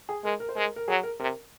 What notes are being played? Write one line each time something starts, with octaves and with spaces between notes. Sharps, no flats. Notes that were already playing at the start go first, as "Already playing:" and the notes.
G#4
G#3 A#4
A#4
C5
G#3 A#4
A#4
F#3 G#4
A#4
C3 A#4